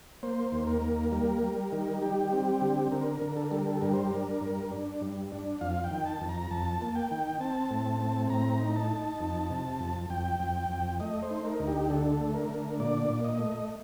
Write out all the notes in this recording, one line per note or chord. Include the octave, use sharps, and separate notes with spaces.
A#3 C5
D#2
A#4
A#3
G3 A#4
G3
D#3
G3 G4
C4
G4
D3
D3 A#4
D3
A4
A#4
G3 A4
A#4
A4
G2 A#4
C5
A#4
D4
G2
D4
G2
D4
F2 F5
G5
D#3
A5
F2
A#5
F2 A5
A#3
G5
D#3
C4 A5
A2
C4
A2 A#5
D#4
A5
D#4
F2
C3
F2
F2 G5
F2
F2
A3 D#5
C5
D#4
A#4
D2
G4
D3 A4
A3
A#4
D3
A#2 D5
A#2
D#5
A3